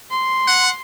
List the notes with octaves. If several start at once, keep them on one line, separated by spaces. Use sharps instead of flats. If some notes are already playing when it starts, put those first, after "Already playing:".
C6
F#5